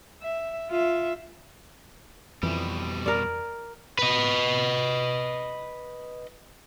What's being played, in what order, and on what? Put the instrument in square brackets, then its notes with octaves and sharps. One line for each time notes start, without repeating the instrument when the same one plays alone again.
[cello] E5
F4 E5
[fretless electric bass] F2 E3 [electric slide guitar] B2 G3
[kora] A#4 D5
[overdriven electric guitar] B4 D#5